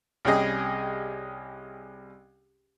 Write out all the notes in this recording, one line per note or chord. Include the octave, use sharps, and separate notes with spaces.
C2 C#4 G4 G#4 D#5